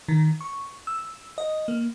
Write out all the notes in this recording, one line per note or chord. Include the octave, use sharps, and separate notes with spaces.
D#3
C#6
E6
D#5
A#3